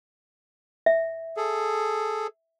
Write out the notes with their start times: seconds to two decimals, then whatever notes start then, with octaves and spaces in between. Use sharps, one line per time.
0.86 E5
1.37 G#4 A4